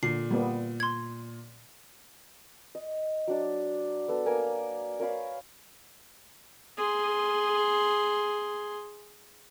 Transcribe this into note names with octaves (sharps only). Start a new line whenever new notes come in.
A#2 D3 C7
G3 A#3 B3
C6 G#6
D#5
F#3 D4 D5
B3 A4
A#3 A#4 G#5 A#5
A#4 C#5 F5 B5
G#4 C6